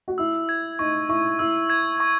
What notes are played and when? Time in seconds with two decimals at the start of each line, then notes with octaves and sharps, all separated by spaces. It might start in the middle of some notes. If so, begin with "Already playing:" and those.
0.08 F#4
0.18 E4 E6
0.49 G#6
0.79 D#4 C#6
1.09 E4 C#6
1.39 E4 E6
1.70 G#6
2.00 C#6